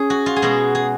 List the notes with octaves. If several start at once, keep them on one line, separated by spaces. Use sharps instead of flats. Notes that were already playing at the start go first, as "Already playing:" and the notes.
Already playing: C#4 G#4
F#4
F4
G#4
B2 G#3 F#4
G#4